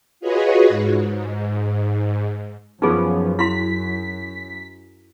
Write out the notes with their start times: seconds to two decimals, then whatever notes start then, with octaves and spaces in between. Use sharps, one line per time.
0.20 F4 F#4 G#4 B4 C#5 D#5
0.69 G#2
2.82 F#2 F3 B3 C#4 D#4 G#4
3.39 E4 C6 B6